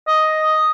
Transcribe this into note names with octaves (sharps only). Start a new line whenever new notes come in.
D#5